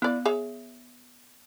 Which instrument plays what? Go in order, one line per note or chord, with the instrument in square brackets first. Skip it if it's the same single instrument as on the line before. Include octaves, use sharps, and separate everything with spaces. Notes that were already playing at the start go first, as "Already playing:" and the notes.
[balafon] B3 [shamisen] E4 D5
[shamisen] G#4 C#5 E5